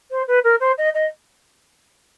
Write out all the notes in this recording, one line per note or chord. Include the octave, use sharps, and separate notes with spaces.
C5
B4
A#4
C5
D#5
D#5